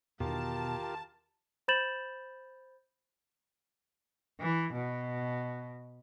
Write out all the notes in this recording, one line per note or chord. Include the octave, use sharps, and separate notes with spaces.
E2 B2 D#3 F4 G4 A#4 A5
C5 B5 G6 A6 E7 F#7
E3
B2